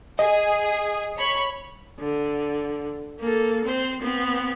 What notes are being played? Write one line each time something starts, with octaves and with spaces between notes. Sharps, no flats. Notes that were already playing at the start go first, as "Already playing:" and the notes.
G#4 D#5
C#5 B5
D3
A#3 A4
C4 C5
B3 C4